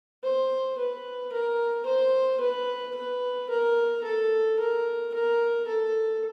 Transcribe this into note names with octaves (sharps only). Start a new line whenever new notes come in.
C5
B4
A#4
C5
B4
B4
A#4
A4
A#4
A#4
A4